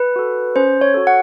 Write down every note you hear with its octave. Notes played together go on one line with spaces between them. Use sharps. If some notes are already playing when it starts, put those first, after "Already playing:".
Already playing: B4
F#4 A4
C#4 C5
C#5
F#4 A4
F#5